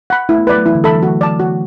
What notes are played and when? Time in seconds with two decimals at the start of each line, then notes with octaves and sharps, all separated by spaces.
0.10 F#5 B5
0.29 A3 E4
0.38 B3
0.47 F#3 B4 D5 B5
0.56 A3
0.66 E3 E4
0.75 D3
0.84 E3 A4 E5 B5
0.94 F#3
1.03 A3 F#4
1.21 D5 A5
1.39 F#4